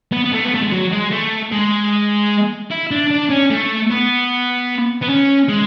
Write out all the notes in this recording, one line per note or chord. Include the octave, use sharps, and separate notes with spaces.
B3
B3
A3
B3
A3
G#3
F#3
G#3
A3
G#3
E4
D4
D4
C#4
A3
B3
B3
C#4
G#3